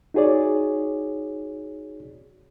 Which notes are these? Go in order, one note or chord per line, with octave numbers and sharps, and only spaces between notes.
D#4 F#4 G#4 C#5 D5